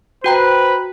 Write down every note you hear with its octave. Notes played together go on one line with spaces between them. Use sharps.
F#4 B4 C5 G5 A#5